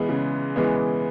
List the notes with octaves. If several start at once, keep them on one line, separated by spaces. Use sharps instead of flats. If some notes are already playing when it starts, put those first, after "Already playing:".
Already playing: E3 G#3 B3
C#3
E3 G#3 B3